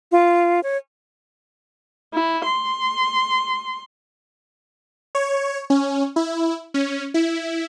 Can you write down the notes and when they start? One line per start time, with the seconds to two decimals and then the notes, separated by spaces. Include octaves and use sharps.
0.12 F4
0.63 C#5
2.14 E4
2.46 C6
5.15 C#5
5.70 C#4
6.16 E4
6.74 C#4
7.14 E4